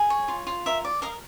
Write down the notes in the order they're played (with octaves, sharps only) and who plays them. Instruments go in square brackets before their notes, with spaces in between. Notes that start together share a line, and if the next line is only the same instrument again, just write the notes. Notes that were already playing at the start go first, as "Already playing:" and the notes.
Already playing: [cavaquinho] G#4
C#5
F4
F4
A#4 E5
D5
A#4 D#5 F5